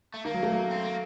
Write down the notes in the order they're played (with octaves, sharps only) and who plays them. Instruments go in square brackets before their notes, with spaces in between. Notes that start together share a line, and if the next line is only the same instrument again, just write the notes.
[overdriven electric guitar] A3
[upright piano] D#3 [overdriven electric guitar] A#3
[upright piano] F#3
A3
F#3
[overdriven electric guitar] C4
A#3